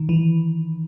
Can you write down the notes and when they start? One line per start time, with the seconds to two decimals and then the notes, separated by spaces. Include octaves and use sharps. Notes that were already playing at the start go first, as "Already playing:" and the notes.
Already playing: D#3
0.09 E3